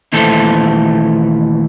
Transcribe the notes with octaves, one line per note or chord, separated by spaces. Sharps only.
D#2 A#2 E3 A3 A4 C5